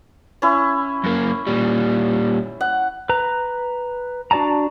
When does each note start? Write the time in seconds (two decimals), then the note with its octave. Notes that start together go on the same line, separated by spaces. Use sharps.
0.42 C#4 E4
1.04 F#2 A#3
1.47 A#2 G3
2.61 F#5
3.09 B4 A#5
4.31 D4 F#4 D5 A5 A#5